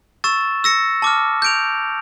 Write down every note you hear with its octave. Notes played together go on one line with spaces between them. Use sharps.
C#6 E6 A6 E7
E6 A#6 C#7
A5 D6 F6
G6 D7 F7